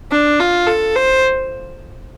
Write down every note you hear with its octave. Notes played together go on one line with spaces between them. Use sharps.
D4
F4
A4
C5